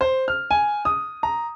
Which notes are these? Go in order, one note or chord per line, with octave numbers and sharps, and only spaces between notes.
C5
F6
G#5
D#6
A#5